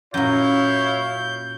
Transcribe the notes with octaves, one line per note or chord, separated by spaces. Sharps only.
F#2 A#2 E4 C#5 F5 G6